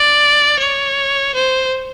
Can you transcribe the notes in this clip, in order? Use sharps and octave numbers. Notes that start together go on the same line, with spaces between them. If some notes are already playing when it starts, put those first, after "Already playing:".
Already playing: D5
C#5
C5